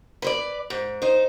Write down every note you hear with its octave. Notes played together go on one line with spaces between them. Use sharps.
B4 C5 D5
G#2
D#4 C5